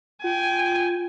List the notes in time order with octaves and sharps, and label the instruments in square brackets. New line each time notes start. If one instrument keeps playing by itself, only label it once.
[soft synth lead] F4 [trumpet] G5 [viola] G#5